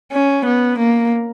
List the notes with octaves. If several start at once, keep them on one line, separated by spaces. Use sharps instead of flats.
C#4
B3
A#3